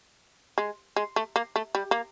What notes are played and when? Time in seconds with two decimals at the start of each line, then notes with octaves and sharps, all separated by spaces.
0.58 G#3
0.96 G#3
1.16 A3
1.36 A#3
1.56 A3
1.75 G3
1.91 A#3